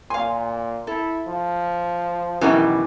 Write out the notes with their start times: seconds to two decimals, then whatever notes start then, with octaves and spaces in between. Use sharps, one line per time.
0.10 A#2 F5 G#5 C6
0.87 E4 A4
1.27 F3
2.41 F#2 B2 D#3 E3 G3 C#4 F#4 A#4